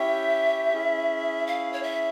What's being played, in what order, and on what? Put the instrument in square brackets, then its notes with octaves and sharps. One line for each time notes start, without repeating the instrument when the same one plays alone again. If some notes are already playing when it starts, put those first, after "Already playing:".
Already playing: [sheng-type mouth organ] C#4 E4 G4 C#5 G5 [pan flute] E5
[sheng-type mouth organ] C#4 E4 G#4
[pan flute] F5
C#5
E5